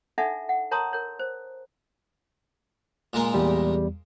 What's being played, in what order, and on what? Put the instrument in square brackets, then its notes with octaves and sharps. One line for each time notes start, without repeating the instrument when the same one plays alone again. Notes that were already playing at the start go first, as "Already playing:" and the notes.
[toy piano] D4 D#4 A4 E5 F#5 A5
F#5
A#4 C#5 A5 A#5 C6 D#6
A#4 C#5
C5
[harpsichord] A#2 G#3 A#4
[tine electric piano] E2 G3